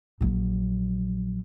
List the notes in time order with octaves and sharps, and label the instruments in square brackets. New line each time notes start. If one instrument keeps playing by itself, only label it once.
[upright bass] A#1 F#3